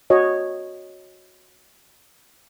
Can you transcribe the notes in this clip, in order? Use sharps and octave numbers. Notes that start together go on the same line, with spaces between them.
F#4 C#5 D#5